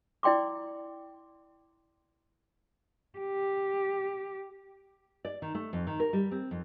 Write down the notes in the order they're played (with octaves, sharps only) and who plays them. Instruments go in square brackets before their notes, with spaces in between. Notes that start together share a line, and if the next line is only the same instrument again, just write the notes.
[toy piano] E4 D5 G5 C6 D6
[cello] G4
[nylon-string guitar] D5
D#3
A3
F2
D#3
A#4
G3
C4
F2